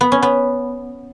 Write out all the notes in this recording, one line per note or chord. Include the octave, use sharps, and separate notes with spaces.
B3
C#4
B3